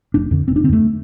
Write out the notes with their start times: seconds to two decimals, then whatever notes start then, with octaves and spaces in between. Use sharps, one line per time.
0.14 F1 D4
0.31 F2 D3
0.48 F1 C4
0.56 D4
0.64 D3 C4
0.69 F2 A3